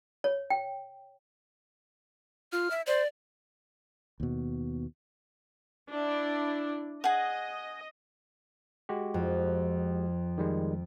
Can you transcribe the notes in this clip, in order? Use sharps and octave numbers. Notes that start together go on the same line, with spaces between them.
C#5
G5
F4 F6
E5
C5 D5
D#2 B2
D4 E4
G#4 D#5 F#5
G#3 F#4 G4
F2
D#3 G3 G#3